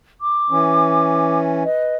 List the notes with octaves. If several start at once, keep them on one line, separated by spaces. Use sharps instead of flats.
D6
E3 C#4
B4 D#5